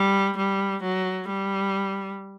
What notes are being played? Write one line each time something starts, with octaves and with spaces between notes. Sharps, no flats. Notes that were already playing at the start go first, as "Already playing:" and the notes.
Already playing: G3
G3
F#3
G3